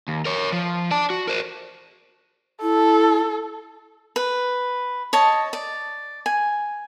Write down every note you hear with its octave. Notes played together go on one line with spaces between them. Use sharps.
D#2
A#4 C#5
F3
D5 A5
F#4
A#4 C5
E4 A4
B4
C#5 D#5 A5
D5
G#5